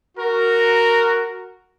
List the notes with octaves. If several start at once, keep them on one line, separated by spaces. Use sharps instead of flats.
F#4 A#4